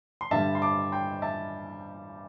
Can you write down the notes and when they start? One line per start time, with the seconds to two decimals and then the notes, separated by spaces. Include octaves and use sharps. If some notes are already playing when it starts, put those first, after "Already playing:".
0.21 C6
0.31 G2 D3 G3 E5 A5
0.55 C6
0.62 A5 D6
0.92 G5 C6
1.22 E5 A5